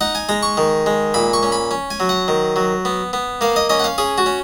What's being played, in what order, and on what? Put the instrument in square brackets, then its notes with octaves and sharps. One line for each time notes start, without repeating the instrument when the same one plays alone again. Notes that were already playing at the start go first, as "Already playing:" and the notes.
[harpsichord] D#4 F#5
G#5
G#3 A#5
C#6
D#3
G#3
A#2 B5
C#6
C#4
B5
C#4
G#5
F#3
F#5
D#3
F#3
B3
B3
A#3 F5
D#5
C#4 D#5
F#5
F5
C#4 G#4
F#4
C#4